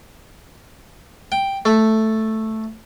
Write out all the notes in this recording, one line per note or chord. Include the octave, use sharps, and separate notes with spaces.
G5
A3